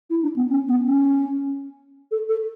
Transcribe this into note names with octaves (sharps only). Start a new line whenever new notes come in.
E4
D4
B3
C#4
B3
C#4
A4
A4